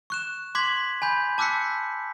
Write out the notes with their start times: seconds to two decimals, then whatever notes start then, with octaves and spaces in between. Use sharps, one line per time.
0.10 C#6 F#6 E7
0.55 C6 D6 F#6 G#6 B6 F#7
1.02 G#5 B5 G6
1.38 A5 D6 E6 F#6 B6 C#7